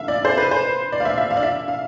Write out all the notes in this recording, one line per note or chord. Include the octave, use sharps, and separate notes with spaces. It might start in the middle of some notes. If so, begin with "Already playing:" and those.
Already playing: E5 F5
D5
C5
B4
C5
D5
F5
E5
E5
F5
D5
E5
F5